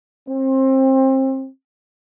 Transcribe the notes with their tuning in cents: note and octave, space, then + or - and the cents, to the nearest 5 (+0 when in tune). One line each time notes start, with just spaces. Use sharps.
C4 +25